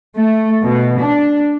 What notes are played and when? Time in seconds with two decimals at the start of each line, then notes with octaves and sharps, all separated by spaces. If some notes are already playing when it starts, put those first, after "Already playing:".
0.17 A3
0.63 B2
0.99 D4